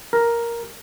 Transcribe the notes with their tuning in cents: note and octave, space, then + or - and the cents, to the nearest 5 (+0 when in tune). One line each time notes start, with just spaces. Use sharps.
A#4 +5